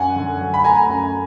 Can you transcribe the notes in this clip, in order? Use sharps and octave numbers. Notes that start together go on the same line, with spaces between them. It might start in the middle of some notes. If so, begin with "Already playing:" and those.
Already playing: F#2 F#5 G#5
D3
F#3
B5
A3 G#5 A#5
F#2